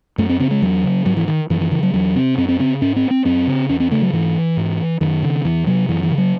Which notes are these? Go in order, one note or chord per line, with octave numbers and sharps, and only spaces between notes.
F#2 A3
C4
C#3 C4
G#3
E2 F#3
C#3
G#2 F#3
E3
D#3
F#2 E3
E3
C#3 E3
F#3
E2 F#3
C3 C4
F#2 C4
C4
C#3 C4
G#2 C#4
C4
C4
F#2 C4
C#3
E2 C#4
C4
C#3 A3
F#3
G#2 E3
G#2
F#2 D#3
C#3
E2 E3
C3 F#3
F#2 E3
E3
C#3
F#3